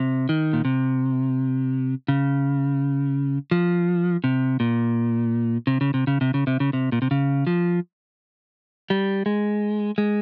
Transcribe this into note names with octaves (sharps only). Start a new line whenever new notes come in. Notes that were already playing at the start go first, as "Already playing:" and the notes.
Already playing: C3
D#3
A#2
C3
C#3
F3
C3
A#2
C3
C#3
C3
C#3
C3
C#3
C3
C#3
C3
A#2
C3
C#3
F3
G3
G#3
G#3